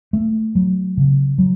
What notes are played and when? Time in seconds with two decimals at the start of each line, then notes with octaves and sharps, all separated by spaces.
0.13 A3
0.55 F#3
0.97 C#3
1.38 F#3